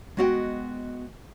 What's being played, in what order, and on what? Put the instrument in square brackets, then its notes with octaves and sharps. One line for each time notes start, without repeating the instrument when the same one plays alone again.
[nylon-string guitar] G#3 B3 F#4 D#5 F5 G5